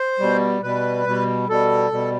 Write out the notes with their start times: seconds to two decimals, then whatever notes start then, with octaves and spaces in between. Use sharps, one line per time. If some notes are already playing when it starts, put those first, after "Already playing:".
Already playing: C5
0.20 B2 G3
0.63 B2 G3 B4
1.06 B2 G3
1.49 B2 G3 A4
1.92 B2 G3